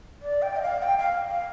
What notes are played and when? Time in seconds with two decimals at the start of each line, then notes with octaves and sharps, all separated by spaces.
0.22 D5
0.42 G5
0.56 D#5
0.62 F5
0.83 G5
0.98 F5
1.29 F5